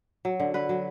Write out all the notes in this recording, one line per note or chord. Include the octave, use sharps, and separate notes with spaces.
F#3
D3
D3 B4
F#3